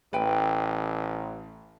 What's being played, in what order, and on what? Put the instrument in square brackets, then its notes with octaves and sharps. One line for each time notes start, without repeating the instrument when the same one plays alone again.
[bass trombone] A1 [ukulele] B4 G5